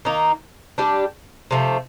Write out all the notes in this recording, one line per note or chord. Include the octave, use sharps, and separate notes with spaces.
D#3 A#3 D#4
G3 D4 G4
C3 F3 A3